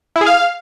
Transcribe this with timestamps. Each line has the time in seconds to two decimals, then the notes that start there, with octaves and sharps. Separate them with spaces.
0.16 E4
0.21 G#4
0.26 F5